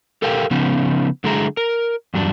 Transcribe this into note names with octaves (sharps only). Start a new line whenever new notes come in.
G4 A4 A#4 F5 G5
C#3 F3 B3 C#4 D#4
D3 F#3 G#3 E4 G#4 A#5
A#4
E2 G2 F#3 D4